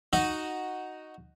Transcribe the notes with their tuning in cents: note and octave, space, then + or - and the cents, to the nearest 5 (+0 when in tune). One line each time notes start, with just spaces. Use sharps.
D#4 +0 F#4 +0 D#5 +0